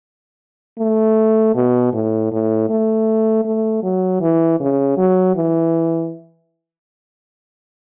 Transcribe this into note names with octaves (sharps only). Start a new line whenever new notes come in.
A3
B2
A2
A2
A3
A3
F#3
E3
C#3
F#3
E3